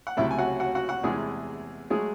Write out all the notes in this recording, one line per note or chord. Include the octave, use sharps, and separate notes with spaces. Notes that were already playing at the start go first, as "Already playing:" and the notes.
F#5
C#2 C3 F#3 A3 E4 E5
G#5
F#4 F#5
F#4 F#5
F#4 F#5
F#4 F#5
E2 C3 E3 G#3 A3 G#4
F#3 G#3 A3 G#4